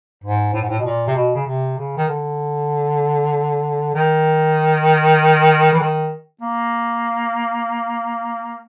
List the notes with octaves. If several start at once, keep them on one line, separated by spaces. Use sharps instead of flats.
G#2
A2
G#2
A2
B2
A#2
C3
B2
C#3
C3
C#3
D#3
D3
D#3
E3
D#3
A#3